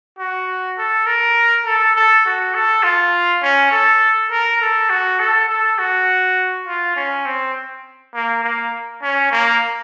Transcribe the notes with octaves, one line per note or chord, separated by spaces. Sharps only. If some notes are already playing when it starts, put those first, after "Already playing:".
F#4
A4
A#4
A4
A4
F#4
A4
F4
C#4
A4
A#4
A4
F#4
A4
A4
F#4
F4
C#4
C4
A#3
A#3
C#4
A#3